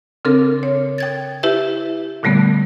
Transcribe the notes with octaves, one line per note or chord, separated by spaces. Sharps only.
C#3 C4 D4 A4 A#4
C#5
G5 G#6 A6
E4 G4 B4 E5
A#2 D3 G3 A3 B3